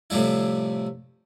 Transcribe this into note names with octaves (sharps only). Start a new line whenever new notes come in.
A2 C3 F3 G3 E4